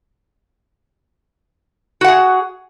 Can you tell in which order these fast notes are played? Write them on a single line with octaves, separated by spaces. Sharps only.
F#4 F#5 G#4